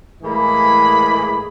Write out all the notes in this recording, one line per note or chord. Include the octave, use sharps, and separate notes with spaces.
A2 E3 G#3 A#3 G#4 B5